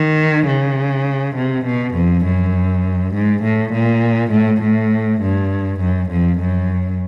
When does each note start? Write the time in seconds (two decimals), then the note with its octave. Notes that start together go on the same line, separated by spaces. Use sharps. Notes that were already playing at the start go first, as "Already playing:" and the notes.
Already playing: D#3
0.47 C#3
1.36 C3
1.66 B2
1.95 F2
2.25 F#2
3.14 G#2
3.43 A2
3.73 A#2
4.32 A2
4.62 A2
5.22 G2
5.81 F#2
6.10 F2
6.40 F#2